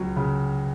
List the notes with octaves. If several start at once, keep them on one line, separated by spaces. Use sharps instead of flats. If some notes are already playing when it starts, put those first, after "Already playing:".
Already playing: C#2 F#3
C#3